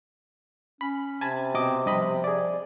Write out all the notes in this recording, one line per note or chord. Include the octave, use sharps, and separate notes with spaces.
C#4 B5
C3 G#5 A5 B5
B2 C4 D#5 D6
G2 F3 D#5 B5
G#4 D5